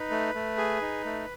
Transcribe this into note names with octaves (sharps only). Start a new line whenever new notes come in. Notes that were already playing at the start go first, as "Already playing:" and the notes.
Already playing: D#4 B4
A3
A3
G#4
D#4
A3